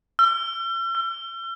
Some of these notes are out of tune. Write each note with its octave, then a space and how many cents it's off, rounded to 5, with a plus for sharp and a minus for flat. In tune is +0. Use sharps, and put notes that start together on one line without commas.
E6 +45
E6 +45